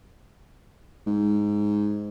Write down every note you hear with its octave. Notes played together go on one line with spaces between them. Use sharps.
G#2